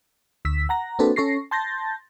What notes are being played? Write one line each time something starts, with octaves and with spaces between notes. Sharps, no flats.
D2 E6 B6
F#5 A#5 A#6
A#3 C4 D4 F#4 A4 B4
C#4 A4 C#6 A#6 C7
A5 C6 G6 A6 A#6